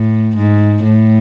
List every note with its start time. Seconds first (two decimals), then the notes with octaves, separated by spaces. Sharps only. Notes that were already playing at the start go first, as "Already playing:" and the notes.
Already playing: A2
0.36 G#2
0.84 A2